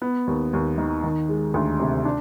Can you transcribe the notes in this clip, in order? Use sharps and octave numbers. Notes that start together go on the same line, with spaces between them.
B3
D#2
D#2
D#3
D#3
G#3
D2
C3
D4